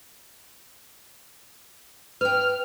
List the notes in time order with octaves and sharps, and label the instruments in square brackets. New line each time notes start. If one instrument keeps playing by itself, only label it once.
[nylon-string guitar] B4 G5 [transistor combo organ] F6